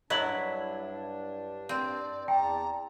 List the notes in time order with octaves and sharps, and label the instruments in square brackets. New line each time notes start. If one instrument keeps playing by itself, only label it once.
[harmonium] G2 D4 [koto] F#3 E4 [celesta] D#5 F#7
[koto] C4 [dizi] D5
[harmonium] E2 D5 A5 [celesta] G5 [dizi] A#5